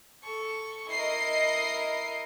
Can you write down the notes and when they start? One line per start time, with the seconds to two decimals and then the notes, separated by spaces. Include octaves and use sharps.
0.23 A4 C#6
0.91 E4 A#4 D#5 C7